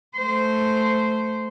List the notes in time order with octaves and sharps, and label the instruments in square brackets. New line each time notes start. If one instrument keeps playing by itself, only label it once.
[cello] A3 C5